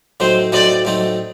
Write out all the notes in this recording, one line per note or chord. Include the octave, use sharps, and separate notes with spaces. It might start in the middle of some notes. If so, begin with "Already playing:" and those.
A2 F#3 C4 D#4 C5
A2 F#3 C4 D#4 D5
A2 F#3 C4 D#4